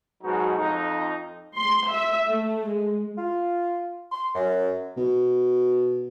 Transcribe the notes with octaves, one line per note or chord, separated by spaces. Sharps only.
G#2 B2 F#3 G#3 D#4 F#4
F2 D#4
C6
E5
A3
G#3
F4
C6
F#2
B2